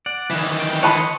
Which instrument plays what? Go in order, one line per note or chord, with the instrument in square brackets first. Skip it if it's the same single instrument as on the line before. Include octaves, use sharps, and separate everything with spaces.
[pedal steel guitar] D5 F#5
[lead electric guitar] D#3 E3
[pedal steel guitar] G5
[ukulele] B4 A5 B5 [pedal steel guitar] C#5 D#5 C6